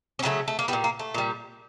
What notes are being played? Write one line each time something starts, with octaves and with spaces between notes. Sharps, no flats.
C#4
C#3 F#3 A3 C4
A3
A#3
A#2 G3 B3
A#3
A3
A#2 G3